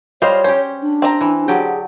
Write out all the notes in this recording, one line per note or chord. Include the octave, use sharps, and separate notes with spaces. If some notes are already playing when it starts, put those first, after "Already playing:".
G3 F4 C5 C#5 D#5 F5
C#4 G4 C5
D4
C4 D#5 A#5
E3
D3 F#3 G4 G#4